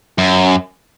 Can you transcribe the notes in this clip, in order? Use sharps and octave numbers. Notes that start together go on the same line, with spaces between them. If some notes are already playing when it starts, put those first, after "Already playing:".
F#2